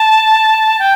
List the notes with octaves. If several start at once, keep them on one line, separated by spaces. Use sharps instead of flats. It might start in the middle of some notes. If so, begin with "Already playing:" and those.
Already playing: A5
G5